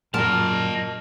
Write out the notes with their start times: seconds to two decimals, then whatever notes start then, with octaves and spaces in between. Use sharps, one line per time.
0.14 F#2 A#2 A#4 D#5 A5